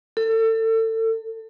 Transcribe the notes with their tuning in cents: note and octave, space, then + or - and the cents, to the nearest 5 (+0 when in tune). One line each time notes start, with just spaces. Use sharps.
A4 +30